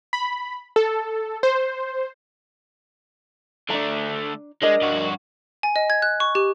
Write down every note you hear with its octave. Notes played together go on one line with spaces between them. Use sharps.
B5
A4
C5
D3 A3 D4 A#5
G#3 D4 A#4 D#5
G2 F#4
G#5
D#5
G#6
F#6
C#6
G4